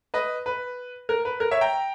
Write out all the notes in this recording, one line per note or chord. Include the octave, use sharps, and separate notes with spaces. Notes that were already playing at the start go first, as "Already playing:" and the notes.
B4 D#5
B4
A#4
B4
A#4
C#5 E5
G5 A#5